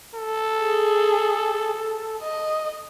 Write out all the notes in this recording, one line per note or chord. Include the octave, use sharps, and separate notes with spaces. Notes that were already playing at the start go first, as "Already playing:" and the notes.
A4
G#4
D#5